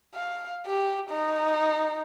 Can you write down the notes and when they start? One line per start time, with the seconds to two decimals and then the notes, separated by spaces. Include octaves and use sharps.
0.15 F5
0.66 G4
1.10 D#4